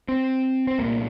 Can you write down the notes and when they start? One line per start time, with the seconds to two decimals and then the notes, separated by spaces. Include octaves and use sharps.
0.08 C4
0.67 C4
0.78 C2 A#2 A#3